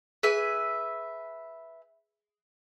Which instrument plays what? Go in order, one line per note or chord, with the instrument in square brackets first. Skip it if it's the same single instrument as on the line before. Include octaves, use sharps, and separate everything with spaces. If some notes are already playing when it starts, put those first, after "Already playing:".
[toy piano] G#4 [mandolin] B4 E5 G#5